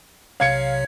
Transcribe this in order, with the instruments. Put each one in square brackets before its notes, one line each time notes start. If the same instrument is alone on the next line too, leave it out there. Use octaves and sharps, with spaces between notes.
[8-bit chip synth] B1 C3 C#5 [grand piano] F5 G#6 C#7